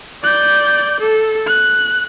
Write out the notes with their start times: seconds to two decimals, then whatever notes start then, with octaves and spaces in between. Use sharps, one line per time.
0.23 D5 G6
1.00 A4
1.46 F#6